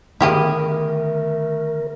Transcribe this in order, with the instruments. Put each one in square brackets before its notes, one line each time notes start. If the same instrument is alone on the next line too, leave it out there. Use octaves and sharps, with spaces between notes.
[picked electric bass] D3 D#3 B3 [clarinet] A3 [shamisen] E4 G4 G#4 [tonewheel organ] A#4